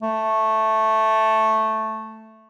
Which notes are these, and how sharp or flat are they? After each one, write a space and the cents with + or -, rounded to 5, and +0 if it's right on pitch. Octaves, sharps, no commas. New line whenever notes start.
A3 +0